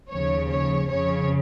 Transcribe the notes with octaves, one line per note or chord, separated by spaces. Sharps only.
D#2 C#3 F3 C#5
C#5
F2 C#3 F3 C#5